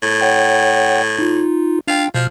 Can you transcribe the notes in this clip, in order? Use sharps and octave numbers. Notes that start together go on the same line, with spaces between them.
A2
C#5 F#5 G5
D#4 F4
D4 F4 G5
B2 F3 F6